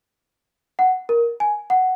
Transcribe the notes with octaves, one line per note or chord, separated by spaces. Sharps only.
F#5
A#4
G#5
F#5